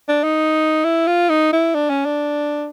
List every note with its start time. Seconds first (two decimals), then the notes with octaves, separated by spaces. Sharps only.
0.08 D4
0.24 D#4
0.84 E4
1.07 F4
1.29 D#4
1.52 E4
1.75 D4
1.90 C#4
2.05 D4